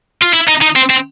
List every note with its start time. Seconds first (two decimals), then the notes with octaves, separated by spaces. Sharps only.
0.22 F4
0.33 E4
0.48 D#4
0.61 D#4
0.76 C4
0.90 C4